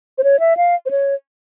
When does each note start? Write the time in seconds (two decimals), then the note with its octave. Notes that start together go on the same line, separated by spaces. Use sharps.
0.18 C5
0.24 C#5
0.40 E5
0.57 F5
0.86 C5
0.91 C#5